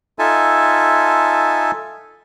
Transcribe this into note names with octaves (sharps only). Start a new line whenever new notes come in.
D#4 F4 A4 E5 G#5 A5